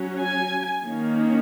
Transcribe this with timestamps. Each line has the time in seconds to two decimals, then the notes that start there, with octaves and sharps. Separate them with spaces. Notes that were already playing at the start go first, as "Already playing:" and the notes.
Already playing: F#3 C#4
0.18 G#5
0.85 D#3 A#3 C#4